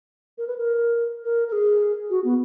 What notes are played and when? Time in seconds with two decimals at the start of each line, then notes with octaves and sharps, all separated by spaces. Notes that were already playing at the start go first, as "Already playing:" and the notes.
0.38 A#4
0.47 B4
0.58 A#4
1.24 A#4
1.48 A#4
1.52 G#4
2.10 F#4
2.24 B3